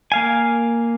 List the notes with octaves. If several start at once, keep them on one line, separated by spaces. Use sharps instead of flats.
A#3 F5 G#5